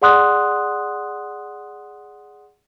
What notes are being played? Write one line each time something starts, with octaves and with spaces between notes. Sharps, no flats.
G#4 D5 F#5 C6 D#6 F#6